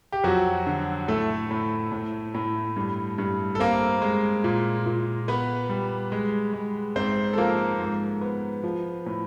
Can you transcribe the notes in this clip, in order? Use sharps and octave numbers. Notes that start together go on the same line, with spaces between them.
G4
F2 F#3 F#4
D3
A2 A3 A4
A2
A2
A2
G2
G2
A4
A#3 C4 A#4
G#3
A#2
A#2
B3 B4
G3
G#3
G#3
G#2 C4 C5
A4
F3 A#3 A#4
G#2
B3
F3
A2